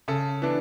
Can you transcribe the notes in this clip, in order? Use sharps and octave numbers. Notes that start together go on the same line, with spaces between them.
C#3 A4
E3 B3 D4